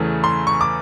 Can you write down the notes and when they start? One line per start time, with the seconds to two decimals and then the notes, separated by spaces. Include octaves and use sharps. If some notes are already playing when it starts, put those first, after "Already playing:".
Already playing: E2 C#3 E3 A3
0.24 C6
0.47 C#6
0.61 D6